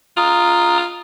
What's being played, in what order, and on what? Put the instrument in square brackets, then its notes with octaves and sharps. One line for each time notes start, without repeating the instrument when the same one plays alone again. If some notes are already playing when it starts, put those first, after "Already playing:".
[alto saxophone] F4 [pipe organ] A#5 D#6